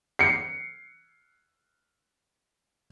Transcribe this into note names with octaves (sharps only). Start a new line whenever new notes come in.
C7 C#7